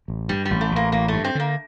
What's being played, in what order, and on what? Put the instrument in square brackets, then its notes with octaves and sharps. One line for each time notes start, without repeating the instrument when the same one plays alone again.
[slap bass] A1
[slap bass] G2 [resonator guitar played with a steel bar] G3
[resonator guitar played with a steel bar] G3
[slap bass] A1
[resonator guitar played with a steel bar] A3
[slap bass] A1
[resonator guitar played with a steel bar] A#3
[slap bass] A1 [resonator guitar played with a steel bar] A#3
[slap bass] G2 [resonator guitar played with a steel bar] A3
[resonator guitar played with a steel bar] C4
[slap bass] D3 [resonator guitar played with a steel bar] A#3